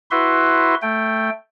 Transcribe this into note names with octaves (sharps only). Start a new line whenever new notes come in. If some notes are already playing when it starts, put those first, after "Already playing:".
E4 F#4 B4 E5 C6
A3 G5